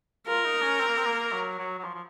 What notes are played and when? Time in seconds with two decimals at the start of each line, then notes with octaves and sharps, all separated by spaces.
0.27 F4 A#4
0.45 D#4
0.62 C#4
0.80 C4
0.88 A#3
0.97 C4
1.05 A#3
1.32 F#3
1.59 F#3
1.78 F#3
1.84 F3
1.94 F3